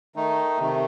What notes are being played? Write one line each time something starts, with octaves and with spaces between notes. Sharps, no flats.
D#3 A3 D#4
C3 D#3 A3